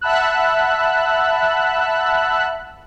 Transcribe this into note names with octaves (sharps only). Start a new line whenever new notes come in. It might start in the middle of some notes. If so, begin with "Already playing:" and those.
E5 F#5 A5 B5 E6 F#6